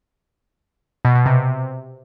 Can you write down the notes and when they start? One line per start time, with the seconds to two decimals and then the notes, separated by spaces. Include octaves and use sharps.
1.05 B2
1.15 B2
1.26 C3